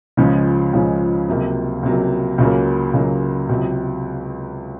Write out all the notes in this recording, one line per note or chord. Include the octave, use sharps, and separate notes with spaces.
C#2 C#3 F3 G#3 C#4
C#2 C#3 F3 G#3 C#4
C#2 C3 F#3 A#3
C#2 C3 F#3 A#3
C#2 C#3 F#3 A#3
C#2 C#3 F#3 A#3
C#2 C3 F#3